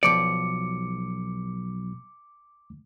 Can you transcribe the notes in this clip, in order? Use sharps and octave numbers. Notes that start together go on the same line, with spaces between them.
B1 F3 D5 D6 C#7